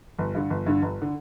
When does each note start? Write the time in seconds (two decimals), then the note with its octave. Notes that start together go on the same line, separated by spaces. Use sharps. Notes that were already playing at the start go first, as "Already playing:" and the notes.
0.19 G1
0.35 G2 D3
0.50 G1
0.66 G2 D3
0.82 G1
1.02 D3